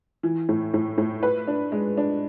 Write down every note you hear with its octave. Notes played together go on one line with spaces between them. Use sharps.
E3
A2
A2
A2
B4
D4
G#3
D4